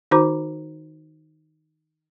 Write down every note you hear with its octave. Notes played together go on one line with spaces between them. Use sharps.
D#3 D#4 F#4 C5 A#5 D6